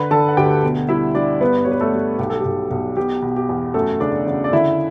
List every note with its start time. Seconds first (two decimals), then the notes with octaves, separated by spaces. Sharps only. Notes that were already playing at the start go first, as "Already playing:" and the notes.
Already playing: D3 B4 B5
0.11 D3 A4 A5
0.28 F#5
0.37 D2 G4 G5
0.63 B2
0.89 G3 E4 E5
1.15 G3 D4 D5
1.41 G2 B3 B4
1.57 D5
1.64 G3 C#5
1.72 B4
1.81 A3 A4
1.94 G3
2.18 B1 G4
2.30 A4
2.40 B1 G4
2.71 B1
2.97 B2 G4
3.22 B2
3.36 G4
3.49 E2
3.74 F#2 A3 A4
4.00 C#3 D4 D5
4.27 C#3
4.44 D5
4.52 D3 E4 E5